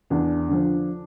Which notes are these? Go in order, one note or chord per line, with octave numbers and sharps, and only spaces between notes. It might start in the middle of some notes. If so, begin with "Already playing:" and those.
E2 D4
D3 F3